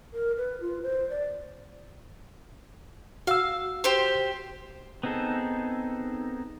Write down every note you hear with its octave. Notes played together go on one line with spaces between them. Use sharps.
A#4
B4
F4
C5
D5
F#4 F5 E6
G4 C5
B3 C4 D#4 G#4 A4